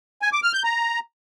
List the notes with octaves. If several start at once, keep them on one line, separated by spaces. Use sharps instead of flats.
G#5
D6
F6
G6
A#5